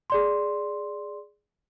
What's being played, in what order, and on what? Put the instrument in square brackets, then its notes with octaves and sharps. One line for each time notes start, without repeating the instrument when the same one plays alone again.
[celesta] G#4 D5 C6